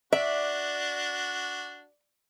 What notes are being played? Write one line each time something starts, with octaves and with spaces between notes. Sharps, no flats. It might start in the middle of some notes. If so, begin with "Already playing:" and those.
D4 F#4 D5 E5